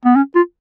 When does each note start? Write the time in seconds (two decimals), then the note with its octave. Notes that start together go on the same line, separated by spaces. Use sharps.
0.05 B3
0.16 C#4
0.35 F4